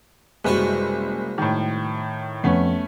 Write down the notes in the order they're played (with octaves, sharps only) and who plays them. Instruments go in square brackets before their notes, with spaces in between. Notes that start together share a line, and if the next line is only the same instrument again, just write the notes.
[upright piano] F#1 [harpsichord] C2 B3 F#4 [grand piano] G#3
[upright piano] A2 D#3
[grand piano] F2 [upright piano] A3 B3 C#4